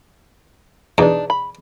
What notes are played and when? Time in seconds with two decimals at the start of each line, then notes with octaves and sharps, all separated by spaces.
0.98 E2 B2 D4 D#4
1.30 B5